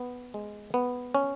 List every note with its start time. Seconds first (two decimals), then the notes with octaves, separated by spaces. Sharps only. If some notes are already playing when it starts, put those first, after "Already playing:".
Already playing: B3
0.34 G#3
0.74 B3
1.15 C#4